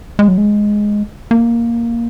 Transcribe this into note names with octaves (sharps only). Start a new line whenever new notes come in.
G#3
F#3
G#3
A#3